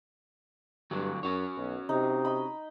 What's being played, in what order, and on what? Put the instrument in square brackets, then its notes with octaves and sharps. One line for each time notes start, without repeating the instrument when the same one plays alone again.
[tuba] G2 [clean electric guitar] D3 F#3
[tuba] F#2 [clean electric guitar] C#4 F#4 C#5
[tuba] B1
[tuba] C3 [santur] D#4
[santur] D#5 B5